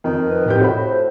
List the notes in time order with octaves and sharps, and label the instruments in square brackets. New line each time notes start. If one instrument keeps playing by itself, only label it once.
[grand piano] F2 [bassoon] D#3
[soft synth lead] B4
[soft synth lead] A2 [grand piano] C3 G4 G6
[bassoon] A2 [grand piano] F#4 B5 [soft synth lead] C5